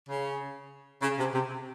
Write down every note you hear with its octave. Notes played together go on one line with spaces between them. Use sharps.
C#3
C#3
C3
C3